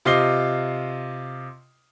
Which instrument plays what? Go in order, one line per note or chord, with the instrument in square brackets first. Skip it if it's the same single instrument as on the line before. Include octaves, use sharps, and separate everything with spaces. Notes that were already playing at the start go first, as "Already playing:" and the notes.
[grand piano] C3 F4 D#5 C7 G7